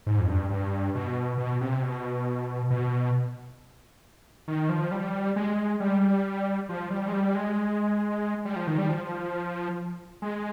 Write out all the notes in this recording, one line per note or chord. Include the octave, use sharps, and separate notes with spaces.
G#2
F2
G2
G2
B2
B2
C3
B2
B2
D#3
F3
G3
G#3
G3
F3
G3
G#3
G3
G#3
G3
F3
D#3
G3
F3
G#3